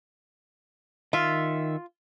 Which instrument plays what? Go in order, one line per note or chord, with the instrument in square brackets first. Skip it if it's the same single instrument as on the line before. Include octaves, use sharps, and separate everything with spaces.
[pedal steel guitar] D#3 E5 [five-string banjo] F4